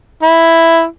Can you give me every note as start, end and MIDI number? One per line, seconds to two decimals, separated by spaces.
0.23 0.84 64